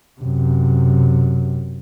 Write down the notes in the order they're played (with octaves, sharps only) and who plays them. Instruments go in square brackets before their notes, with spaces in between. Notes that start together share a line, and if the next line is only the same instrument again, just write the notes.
[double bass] F#2 C3